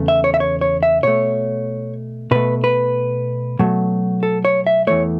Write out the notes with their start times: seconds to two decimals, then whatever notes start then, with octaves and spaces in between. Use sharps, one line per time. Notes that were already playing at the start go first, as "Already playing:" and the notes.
Already playing: E2 C#3 A3
0.08 E5
0.24 C#5
0.34 E5
0.40 C#5
0.61 C#5
0.83 E5
1.03 B2 A3 C#5
2.31 B2 A3 B4
2.64 B4
3.59 B2 F#3 A3
4.23 A4
4.45 C#5
4.67 E5
4.87 E2 E3 A3 C#5